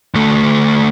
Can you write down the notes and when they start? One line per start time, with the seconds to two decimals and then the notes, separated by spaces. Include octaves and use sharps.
0.15 D2 A3